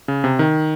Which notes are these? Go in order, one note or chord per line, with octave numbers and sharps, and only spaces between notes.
C#3
C3
D#3